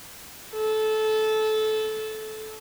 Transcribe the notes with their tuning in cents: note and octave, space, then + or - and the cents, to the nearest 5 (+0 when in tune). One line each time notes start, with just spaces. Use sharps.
A4 -20